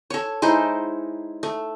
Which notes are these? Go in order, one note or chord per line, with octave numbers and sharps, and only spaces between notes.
A4 C#5
G#3 D#4 E4 C5
A3